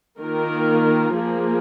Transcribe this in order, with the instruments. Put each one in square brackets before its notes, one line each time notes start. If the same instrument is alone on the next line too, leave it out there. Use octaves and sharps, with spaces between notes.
[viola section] D#3 A#3 F4 A#4
F3 A#3 G#4